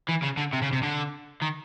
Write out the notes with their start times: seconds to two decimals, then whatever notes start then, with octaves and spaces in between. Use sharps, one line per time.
0.09 E3
0.23 C#3
0.38 D3
0.53 C3
0.62 C#3
0.73 C3
0.83 D3
1.42 D#3